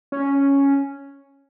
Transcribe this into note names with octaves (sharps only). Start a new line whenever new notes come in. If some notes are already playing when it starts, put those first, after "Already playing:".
C#4